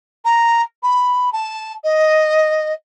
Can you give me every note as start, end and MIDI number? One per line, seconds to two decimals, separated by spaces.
0.25 0.62 82
0.83 1.32 83
1.32 1.73 81
1.84 2.73 75